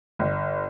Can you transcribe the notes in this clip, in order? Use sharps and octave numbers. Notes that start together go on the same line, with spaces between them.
G1